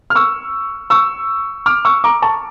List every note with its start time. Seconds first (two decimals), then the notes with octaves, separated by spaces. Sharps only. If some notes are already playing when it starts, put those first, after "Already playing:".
0.10 F6
0.15 C#6 E6
0.90 C#6 E6
1.66 D6 F6
1.85 C#6 E6
2.04 A#5 D6
2.22 A5 C#6